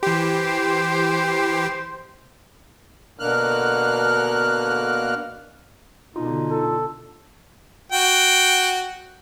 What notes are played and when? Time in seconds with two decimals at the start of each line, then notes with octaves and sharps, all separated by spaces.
0.03 E3 G4 C5
3.19 B2 D3 A#3 F6 F#6
6.16 B2 D3 D#4 F4
6.51 A4
7.92 F#4 G5